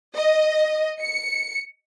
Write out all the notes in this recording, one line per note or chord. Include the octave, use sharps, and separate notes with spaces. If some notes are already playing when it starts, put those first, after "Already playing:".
D#5
C#7